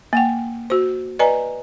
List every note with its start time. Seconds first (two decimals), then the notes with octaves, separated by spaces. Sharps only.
0.13 A#3 F#5 G5
0.70 F#4 C5
1.19 B4 D5 D#5 G#5 A#5